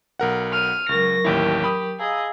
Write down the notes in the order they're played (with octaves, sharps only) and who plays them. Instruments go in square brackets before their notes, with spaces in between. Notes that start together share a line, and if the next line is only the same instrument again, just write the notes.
[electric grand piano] B1 A#4 F#5
[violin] F6 D#7
[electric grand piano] C#2 [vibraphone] F#3 A#4 C#6 [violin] A#6
[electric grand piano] A1 D#2 E4 [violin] G4
[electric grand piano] B5 D#6
[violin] G#4 D#5 [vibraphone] F5 A#5 E6